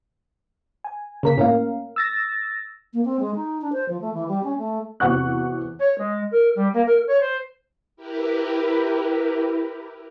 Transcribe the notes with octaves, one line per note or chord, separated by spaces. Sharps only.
G#5
C#3 A#3 B6
A2 A#3 C#4 A#4 F5
E6 A6 A#6
A#3
C4
G#3
D#4
D4
C5
F3
A3
E3
G3
C#4
A3
E2 C3 F#4 F#5 C#6 F#6
C#5
G#3
A#4
G3
A#3
A#4
C#5
C5
E4 G4 A#4 B4